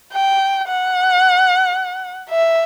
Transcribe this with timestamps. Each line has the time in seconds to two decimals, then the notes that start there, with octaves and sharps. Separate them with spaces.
0.13 G5
0.67 F#5
2.30 E5